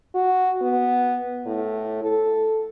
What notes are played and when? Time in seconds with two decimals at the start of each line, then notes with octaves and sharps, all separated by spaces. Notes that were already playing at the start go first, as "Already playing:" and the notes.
0.15 F#4
0.62 B3
1.46 A2
2.02 A4